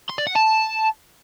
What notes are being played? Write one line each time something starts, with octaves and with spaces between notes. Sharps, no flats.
C6
D5
F#5
A5